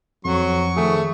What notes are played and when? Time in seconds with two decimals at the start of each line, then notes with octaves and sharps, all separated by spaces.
0.25 F2 F#3 C#6
0.77 D#3 F3 A3 G#4